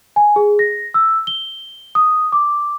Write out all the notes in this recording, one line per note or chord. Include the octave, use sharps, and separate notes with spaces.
G#5
G#4
A#6
E6
G7
D#6
D6